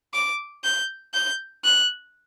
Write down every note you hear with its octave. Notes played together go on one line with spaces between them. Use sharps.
D6
G6
G6
F#6